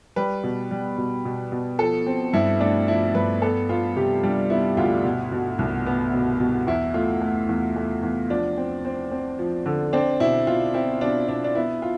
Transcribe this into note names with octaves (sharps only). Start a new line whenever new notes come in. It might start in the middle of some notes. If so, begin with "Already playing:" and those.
G3 B4
B2
G3
B2
B2
B2
F3 A4
C4
G2 E4
A3 D4
F3 E4
G2 B4
B3 A4
B3 F4
C3 G4
G3 D4
B3 E4
D2 F4
B2
B2
C2
B3
B2
B2
E2 E4
A3 F4
A3
E2
A3
E2
F3 D4
C4
C4
C4
F3
D3
C4 D4
B2 E4
B2 F4
C4 E4
B2 D4
B2 D4
D4
B3 E4
F4